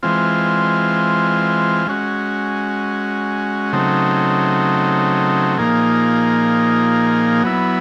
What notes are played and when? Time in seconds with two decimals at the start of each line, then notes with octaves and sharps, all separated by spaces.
0.03 E3 G#3 C4 F4
1.87 G#3 C#4 F#4
3.73 C#3 F#3 A3 C4 D#4
5.58 A#2 F3 A#3 D#4 G#4
7.43 F#3 B3 E4